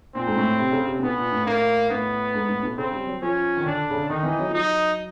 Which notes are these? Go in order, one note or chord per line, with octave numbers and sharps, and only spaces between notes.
A#2 C4
G#2
A2
C3
C#3
C3
A#2
B2 B3
A#2
A2
A2 A#3
A2 B3
G#2
A2
B2
C#3 C4
G3
F#3
F3 C#4
D#3
D3 D4
C#3
D3
D#3 D#4
E3
F#3
F3
F#3 D#4